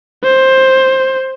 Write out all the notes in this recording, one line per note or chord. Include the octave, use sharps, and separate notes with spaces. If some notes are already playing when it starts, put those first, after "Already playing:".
C5